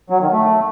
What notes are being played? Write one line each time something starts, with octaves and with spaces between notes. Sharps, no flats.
F#3
D#3
A3